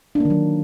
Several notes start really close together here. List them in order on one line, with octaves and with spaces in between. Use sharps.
D4 A#3 D#3 F#3